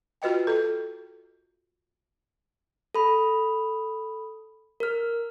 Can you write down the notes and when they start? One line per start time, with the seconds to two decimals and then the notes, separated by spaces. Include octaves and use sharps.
0.22 F4 F#4 B4 D#5 G5
0.47 A4
2.95 A4 B5
4.80 A#4 F6